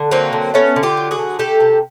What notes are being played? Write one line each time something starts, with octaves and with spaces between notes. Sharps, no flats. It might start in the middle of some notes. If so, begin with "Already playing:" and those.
Already playing: D3
F#3 A#3 C4
D3
A3 B3 C#4
D3
F4 G4
F#3
F#4 G#4
D3
A3 G4 A4
C3